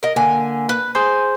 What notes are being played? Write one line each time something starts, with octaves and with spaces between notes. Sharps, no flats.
A#4 D#5
D3 A#3 G#5
B4
G#4 C5 G#5 C6